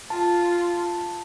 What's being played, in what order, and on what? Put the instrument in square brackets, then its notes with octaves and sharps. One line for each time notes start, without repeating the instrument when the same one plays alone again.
[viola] F4 [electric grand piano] A5